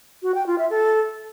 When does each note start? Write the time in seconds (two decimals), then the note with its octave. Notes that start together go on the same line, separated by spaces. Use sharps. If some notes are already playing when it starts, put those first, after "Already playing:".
0.23 F#4
0.35 G5
0.46 F4
0.58 E5
0.70 A4